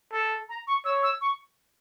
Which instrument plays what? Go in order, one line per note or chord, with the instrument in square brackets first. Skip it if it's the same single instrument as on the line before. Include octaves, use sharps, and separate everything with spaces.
[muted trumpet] A4
[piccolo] A#5
C#6
[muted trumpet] C#5 [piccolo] E6
[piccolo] E6
C#6